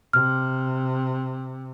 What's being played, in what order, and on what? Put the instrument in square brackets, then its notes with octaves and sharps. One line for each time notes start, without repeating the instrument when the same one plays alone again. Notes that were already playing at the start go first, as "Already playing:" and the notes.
[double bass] C3 [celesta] F6